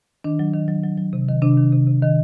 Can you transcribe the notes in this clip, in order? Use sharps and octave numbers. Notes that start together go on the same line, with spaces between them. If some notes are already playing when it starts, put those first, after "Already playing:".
D#3 D4
F#3
D#3
F#3
F#3
F#3
C3
D#3
C3 D4
D#3
C3
C3
D#3